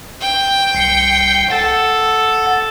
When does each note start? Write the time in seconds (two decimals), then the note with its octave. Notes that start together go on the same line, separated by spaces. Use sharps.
0.22 G5
0.75 C2 C7 C#7
1.50 A4 F#5 A6